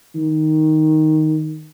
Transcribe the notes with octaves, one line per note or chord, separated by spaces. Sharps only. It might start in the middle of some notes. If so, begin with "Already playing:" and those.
D#3